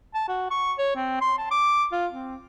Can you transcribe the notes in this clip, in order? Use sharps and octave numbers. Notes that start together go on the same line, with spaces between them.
A5
F#4
C#6
C#5
C4
C6
A5
D6
F4
C4